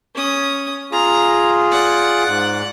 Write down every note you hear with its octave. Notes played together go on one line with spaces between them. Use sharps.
C#4 D#6
F4 G#4 A#5
D5 F#5
G#2 F#6